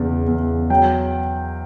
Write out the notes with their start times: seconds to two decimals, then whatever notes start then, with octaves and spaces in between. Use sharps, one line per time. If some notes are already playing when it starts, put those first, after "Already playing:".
Already playing: E2 C#3
0.27 E2
0.70 F#3 G5